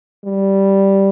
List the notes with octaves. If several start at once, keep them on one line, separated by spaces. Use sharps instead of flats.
G3